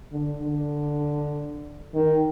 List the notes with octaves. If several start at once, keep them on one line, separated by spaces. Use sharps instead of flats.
D3
D3
D#3